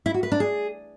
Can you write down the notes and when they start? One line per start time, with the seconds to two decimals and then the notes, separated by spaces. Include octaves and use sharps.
0.06 E4
0.14 F#4
0.23 B4
0.32 D4
0.40 G#4